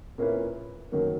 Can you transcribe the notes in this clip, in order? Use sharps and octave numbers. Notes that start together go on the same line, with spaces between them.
A#2 A#3 C#4 E4 B4
F#2 D#3 F#3 A#3